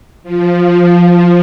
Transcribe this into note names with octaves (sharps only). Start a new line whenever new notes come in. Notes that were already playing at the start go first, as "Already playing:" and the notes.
F3